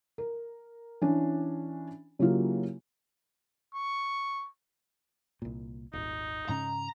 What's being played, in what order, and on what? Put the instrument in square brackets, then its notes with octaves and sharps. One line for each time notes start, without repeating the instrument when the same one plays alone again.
[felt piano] A#4
E3 C#4 D4
C#3 F#3 A#3 E4 F4 G4
[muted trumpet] C#6
[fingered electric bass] C2 A#2
[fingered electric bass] D#1 G#1 [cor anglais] D#4
[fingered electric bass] G#2 C#3 C#4 [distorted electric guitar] A#5